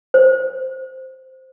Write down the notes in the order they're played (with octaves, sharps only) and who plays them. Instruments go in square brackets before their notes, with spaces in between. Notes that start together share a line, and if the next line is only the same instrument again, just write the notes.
[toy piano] C5